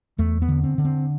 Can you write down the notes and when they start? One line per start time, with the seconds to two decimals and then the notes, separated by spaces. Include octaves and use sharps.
0.18 E2 A3
0.42 B3
0.49 D3
0.64 C4
0.78 D3
0.85 C4